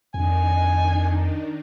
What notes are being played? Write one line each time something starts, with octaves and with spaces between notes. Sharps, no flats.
F2 D#3 D4 D#4 G#5